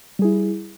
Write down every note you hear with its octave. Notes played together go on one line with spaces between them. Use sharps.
G3 E4 G#4